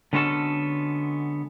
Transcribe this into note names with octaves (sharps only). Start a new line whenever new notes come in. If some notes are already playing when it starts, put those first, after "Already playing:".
D3 G#3 B3 C#4 F#4 A4